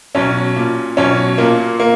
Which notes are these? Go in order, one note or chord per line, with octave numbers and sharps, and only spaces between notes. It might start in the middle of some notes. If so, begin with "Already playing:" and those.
B1 C#4
A#2
B1 C#4
A#2 A#3
A#3